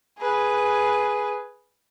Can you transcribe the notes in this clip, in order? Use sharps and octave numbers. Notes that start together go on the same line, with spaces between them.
G#4 B4